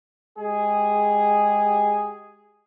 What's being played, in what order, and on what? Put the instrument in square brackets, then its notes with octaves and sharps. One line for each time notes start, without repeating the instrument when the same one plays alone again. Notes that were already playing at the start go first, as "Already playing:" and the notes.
[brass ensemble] G#3 G4 G#4